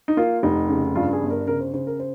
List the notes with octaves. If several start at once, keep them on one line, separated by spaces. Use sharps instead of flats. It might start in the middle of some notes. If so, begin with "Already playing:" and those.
D#4
A#3 F4
F1 D#4
C#3
G2 F4
G#4
G1
A#4
C#3 A#4
C5
C#3 C5
A#4
C5